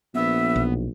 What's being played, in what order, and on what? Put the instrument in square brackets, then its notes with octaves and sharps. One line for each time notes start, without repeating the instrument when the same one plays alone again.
[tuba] A#1 [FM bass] B3 [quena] E5
[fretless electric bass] B1